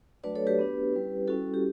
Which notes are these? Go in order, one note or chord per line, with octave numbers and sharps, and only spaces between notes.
F#3 A3 D4 F#4 B4 D5
A4 C#5
G4 B4
B3 D4 F#4
G3 C#4 E4
G3 C#4 E4 F#4 A4
G4